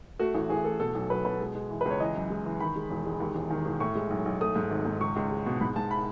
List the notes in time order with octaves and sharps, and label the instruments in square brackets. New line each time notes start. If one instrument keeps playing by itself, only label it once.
[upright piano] A3 F#4
A1
A1 G#4
A3 A4
B2 A4
B1
F#3 B4
B2 B4
G#3
G#3
E3
C#2 B4
C#5
E3 D#5
F#2
G#3
E3
D#3 B5
G#3
E1
G#3
D#2
E1
D#3
E1
A2 C#6
G#3
B1
B1
A3 D#6
G#2
G#1
G#2
C#2 C#6
C#2
G#3
B2
G#2 B5
G#2 A5
B5